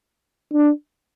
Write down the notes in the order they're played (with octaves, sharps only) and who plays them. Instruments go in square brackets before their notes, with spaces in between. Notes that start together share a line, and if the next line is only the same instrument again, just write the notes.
[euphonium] D4